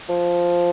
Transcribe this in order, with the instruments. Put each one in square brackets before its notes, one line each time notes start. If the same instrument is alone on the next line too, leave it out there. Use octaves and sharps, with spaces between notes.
[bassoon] F3